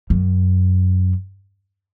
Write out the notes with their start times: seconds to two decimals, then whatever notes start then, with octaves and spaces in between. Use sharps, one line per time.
0.10 F#2